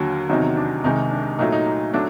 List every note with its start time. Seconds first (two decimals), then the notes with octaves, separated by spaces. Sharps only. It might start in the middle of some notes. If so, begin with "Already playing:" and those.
Already playing: D#2 D3 F#3
0.29 E2 C3 D#3 F#3 D#4
0.57 D4
0.84 C2 C3 D#3 G#3 D#4
1.11 D4
1.38 A#2 F#3 A3 D#4
1.52 D#4
1.67 D#4
1.93 F#3 A3 D4